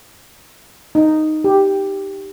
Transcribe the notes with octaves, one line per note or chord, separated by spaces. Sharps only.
D#4
G4